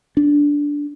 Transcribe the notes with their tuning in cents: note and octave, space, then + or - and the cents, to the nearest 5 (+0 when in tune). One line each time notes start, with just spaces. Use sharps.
D4 -10